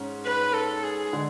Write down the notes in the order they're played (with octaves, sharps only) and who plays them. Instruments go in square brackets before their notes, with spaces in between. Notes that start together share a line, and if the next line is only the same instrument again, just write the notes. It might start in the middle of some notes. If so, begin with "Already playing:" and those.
Already playing: [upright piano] G#2 C#4
[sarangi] B4
A4
G#4
[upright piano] D3 G#3